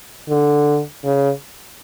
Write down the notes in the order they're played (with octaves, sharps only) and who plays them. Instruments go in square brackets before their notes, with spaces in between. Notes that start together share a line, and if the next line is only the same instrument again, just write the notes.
[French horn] D3
C#3